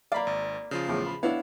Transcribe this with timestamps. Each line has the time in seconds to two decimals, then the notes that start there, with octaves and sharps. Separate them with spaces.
0.12 A#3 D5 F5 B5
0.27 G#1
0.71 C#3 F3 F4
0.87 E2 A2
1.07 B5
1.23 B3 D4 E4 C#5 F5